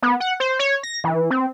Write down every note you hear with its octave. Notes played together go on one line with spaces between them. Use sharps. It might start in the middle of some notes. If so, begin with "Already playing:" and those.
B3
F#5
C5
C#5
A#6
E3
C4